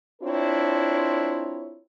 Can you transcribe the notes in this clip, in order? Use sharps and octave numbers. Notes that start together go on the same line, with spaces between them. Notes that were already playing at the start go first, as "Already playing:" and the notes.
C4 D4 E4 F4 A#4 C#5